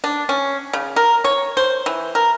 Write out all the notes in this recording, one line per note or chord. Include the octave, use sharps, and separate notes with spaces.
D4
C#4
C#3
A#4
C#5
C5
E3
A#4